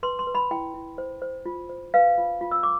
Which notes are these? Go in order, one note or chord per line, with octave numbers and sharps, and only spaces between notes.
B4 C6
C6
B4
B5
E4 G5
E4
C5
C5
F4
C5
B4 F5
F4
F4
E6
D6